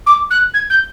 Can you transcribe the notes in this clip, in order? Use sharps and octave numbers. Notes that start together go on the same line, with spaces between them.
D6
F#6
G#6
G6